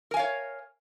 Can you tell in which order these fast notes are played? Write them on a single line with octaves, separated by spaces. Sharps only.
A#4 G#5 F5 C#5